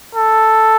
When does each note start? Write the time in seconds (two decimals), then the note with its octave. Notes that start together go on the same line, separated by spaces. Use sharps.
0.15 A4